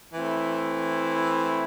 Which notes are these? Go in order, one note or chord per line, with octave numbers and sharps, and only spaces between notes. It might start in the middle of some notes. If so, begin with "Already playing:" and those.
E3 A3 C4 E4